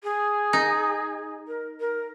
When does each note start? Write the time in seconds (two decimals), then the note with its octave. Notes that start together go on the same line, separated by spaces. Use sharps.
0.03 G#4
0.53 D#4
1.47 A#4
1.80 A#4